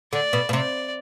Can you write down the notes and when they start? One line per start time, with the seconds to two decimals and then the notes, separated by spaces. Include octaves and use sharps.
0.13 D3 D5
0.33 B2
0.49 B2
0.53 C3 D5